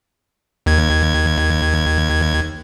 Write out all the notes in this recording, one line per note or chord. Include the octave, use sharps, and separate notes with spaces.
D#2 G#6